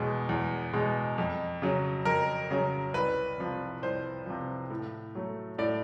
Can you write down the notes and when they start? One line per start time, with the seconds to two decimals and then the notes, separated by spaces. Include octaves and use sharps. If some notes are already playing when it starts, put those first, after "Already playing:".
Already playing: E2 B2 G#3
0.29 E2
0.73 B2 G#3
1.18 F2
1.62 C#3 F#3
2.05 F2 A#4
2.51 C#3 F#3
2.94 C2 B4
3.38 C3 F3
3.82 C2 C5
4.26 C3 F3
4.70 A2
5.15 F#3 A3
5.58 A2 D5